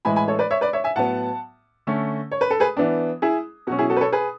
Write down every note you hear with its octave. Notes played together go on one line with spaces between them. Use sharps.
A2 E3 G#3 G#5 B5
G#5 B5
A4 C#5
B4 D5
C#5 E5
B4 D5
C#5 E5
E5 G#5
A2 F#3 B3 F#5 A5
D3 A3 C#4
C#5
B4
A4
G#4 B4
E3 B3 D4
E4 G#4
B2 F#3 C#4 F#4
E4 G#4
F#4 A4
B4
A4 C#5
G#4 B4